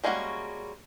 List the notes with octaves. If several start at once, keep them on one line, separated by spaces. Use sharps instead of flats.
G3 G#3 A#3 C#4 F#4